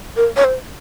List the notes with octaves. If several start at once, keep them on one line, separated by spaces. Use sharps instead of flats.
A#4
C#5
C5